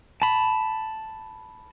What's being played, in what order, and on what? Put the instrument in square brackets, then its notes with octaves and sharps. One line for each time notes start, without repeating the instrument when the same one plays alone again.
[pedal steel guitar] A5 B5